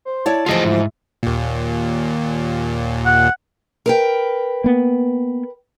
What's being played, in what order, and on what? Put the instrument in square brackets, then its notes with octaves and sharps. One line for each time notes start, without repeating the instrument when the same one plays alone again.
[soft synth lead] C5
[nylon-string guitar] E4 C#5 D5 [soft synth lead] A5
[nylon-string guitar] D2 E3 F3 [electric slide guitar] F4 G#4 D#5
[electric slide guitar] G#2 [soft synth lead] E4
[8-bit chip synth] D#2 A#2
[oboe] F#5
[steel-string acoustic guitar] A#4 B4 G5
[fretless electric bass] A#3 B3